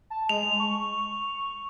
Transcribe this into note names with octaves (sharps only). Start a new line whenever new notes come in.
A5
G#3 F7
C#6